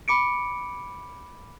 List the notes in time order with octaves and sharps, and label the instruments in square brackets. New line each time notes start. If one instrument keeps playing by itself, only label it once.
[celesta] B5 D6 C#7 D7